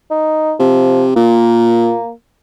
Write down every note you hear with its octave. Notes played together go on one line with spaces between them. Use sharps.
D#4
C3 F3
A#2 A#3